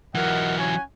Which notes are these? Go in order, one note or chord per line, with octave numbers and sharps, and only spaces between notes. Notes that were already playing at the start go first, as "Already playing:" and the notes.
E3 F#3 A#4 D#5 F#5
C#4 F#5 G#5